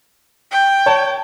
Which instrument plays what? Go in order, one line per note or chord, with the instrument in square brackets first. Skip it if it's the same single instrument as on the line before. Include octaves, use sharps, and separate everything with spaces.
[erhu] G5
[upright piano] C#5 A5